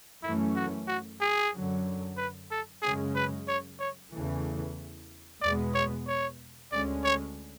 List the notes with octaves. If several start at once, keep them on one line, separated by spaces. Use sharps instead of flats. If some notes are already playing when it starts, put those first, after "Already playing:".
F#2 E3 A3 C#4 E4
F#4
F#4
G#4
F#2 D3 F#3
B4
A4
F#2 C#3 G#3 C#4 G#4
B4
C#5
C#5
E2 C#3 E3 A3
E2 B2 G#3 B3 D5
C#5
C#5
D2 D3 G#3 C#4 D5
C#5